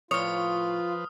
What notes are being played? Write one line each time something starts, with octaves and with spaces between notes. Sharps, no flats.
A2 F3 F4 B4 C#5 D#6 F6